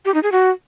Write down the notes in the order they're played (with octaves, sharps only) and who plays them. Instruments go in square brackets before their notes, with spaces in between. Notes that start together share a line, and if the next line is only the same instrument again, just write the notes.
[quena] G4
D#4
G#4
F#4